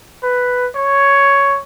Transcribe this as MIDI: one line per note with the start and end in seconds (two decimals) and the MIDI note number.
0.23 0.67 71
0.75 1.58 73